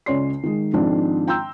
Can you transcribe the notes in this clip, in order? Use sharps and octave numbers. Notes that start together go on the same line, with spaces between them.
C#2 C#4 C#5 D5 C6 C7
D#3 G#3
G#2 D#3 F3 G#3 C4 D4
G5 A#5 C6 E6 G6